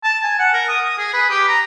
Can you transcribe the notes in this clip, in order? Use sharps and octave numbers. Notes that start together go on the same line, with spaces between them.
A5
G#5
F#5
A#4
D#6
D#6
G#4
B4
G4
A#5